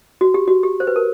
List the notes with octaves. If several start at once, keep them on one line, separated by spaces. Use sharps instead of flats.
F#4
G4
F#4
G4
C5
B4
A#4